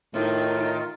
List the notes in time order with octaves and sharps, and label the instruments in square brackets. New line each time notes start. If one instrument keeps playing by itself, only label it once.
[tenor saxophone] A2 [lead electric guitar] D#3 [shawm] F4